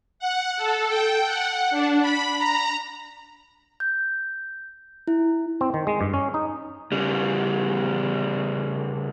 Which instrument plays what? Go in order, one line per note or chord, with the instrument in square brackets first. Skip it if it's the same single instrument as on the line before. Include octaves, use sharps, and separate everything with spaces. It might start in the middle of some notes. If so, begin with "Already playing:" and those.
[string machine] F#5
A4
G5
F#5
D4
B5
A#5
[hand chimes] G6
E4
[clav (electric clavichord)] C4
D#3
G#3
G2
C#4
D#4
[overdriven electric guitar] C#3 G3